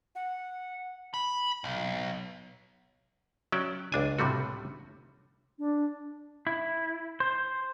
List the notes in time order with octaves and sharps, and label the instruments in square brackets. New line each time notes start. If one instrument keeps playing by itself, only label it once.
[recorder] F#5
[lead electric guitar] B5
B1
[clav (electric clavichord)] F#3 C#4 D5 E5 G5
C#2 D4 G#5
A2 C3 G3 A3 F#4
[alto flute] D4
[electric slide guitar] E4
C5